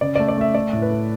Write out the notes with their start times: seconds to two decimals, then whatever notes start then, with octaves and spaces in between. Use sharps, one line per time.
0.01 C#3 D5
0.15 A3 D5
0.29 D5
0.38 A3 E5
0.55 A3 D5
0.73 A2
0.82 B4
0.90 A3